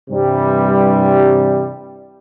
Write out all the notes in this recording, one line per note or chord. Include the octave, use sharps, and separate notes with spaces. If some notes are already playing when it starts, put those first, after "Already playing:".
G2 C3 E3 G3